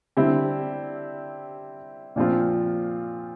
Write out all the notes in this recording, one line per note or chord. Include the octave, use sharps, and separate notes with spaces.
D3 G3 C4 E4 G4
A#2 F3 C4 F4